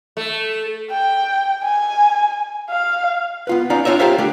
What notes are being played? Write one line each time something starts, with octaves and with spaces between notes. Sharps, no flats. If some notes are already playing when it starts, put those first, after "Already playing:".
A3
G5
G#5
F5
B3 F4 B4
C#4 D#4 F4 D5 F5
D4 F4 G4 C#5 D#5 E5
F4 G4 A#4 C5 E5 F5
D3 A3 G4